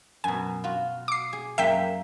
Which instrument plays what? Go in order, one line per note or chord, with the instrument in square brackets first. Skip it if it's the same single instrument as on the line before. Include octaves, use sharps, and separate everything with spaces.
[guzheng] F#2 B2 [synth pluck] G#5
[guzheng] F4 F#4
[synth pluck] D6 C7
[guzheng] G#4
[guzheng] F#2 A#3 [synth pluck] E5 G5 B6